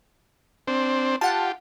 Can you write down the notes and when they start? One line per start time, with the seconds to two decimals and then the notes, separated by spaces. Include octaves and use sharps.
0.67 C4 D4 C5
1.21 F4 G4 F#5 A5